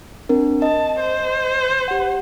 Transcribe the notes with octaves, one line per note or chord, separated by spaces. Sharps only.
C4 D4 A#4
D#5 A5
C5
G4 F#5